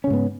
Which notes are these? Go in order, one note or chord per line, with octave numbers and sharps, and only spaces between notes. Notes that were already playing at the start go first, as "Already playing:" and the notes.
G#2 C#3 B3 C#4